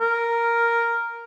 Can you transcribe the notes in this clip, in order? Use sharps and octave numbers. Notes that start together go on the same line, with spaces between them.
A#4